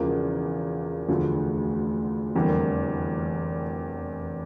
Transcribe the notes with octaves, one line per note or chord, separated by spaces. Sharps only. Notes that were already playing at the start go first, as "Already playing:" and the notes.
Already playing: E1 E2 C#3 F3 A#3
E1 D2 D3 F3 A3
F1 E2 D3 G3 A#3